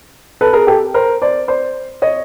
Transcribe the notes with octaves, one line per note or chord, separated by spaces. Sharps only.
A4 B4
G#4 A#4
G4 A4
A#4 C5
C5 D5
C5 D5
C#5 D#5